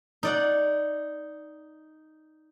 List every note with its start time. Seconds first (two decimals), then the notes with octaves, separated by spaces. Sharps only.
0.23 D#4 D5 F#5